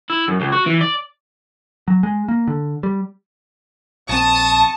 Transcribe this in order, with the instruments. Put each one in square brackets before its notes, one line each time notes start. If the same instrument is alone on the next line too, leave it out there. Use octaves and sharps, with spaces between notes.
[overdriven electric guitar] E4
F#2
C#2
F#4
E3
D5
[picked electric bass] F#3
G#3
A#3
D3
G3
[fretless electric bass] A#1 C4 [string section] A5 [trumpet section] C#6 D#6